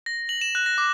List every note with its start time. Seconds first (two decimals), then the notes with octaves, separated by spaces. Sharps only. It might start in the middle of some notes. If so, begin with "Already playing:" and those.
0.06 A#6
0.29 F#7
0.41 E7
0.55 F#6
0.66 A#6
0.78 D6